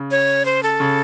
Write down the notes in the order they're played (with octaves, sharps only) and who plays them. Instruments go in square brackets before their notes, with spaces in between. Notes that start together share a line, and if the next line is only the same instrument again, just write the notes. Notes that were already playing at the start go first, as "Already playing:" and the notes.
Already playing: [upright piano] C#3
[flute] C#5
C5
A4
[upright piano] C#3